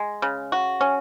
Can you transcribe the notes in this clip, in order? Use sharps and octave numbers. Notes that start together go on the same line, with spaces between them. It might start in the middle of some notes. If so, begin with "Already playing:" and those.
Already playing: G#3
C#3
F#4
C#4